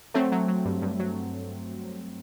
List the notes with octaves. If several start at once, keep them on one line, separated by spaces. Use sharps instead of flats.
F#3 A3 C4
F#3
F#3
G2
G2
F#3